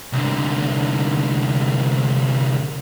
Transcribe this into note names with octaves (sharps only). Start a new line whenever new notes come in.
C2 D3